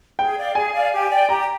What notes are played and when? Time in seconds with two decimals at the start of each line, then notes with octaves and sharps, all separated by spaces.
0.19 G#4 G5
0.37 D5 F5
0.55 G#4 G#5
0.73 D5 F5
0.93 G4
1.10 D5 G5
1.29 G4 A#5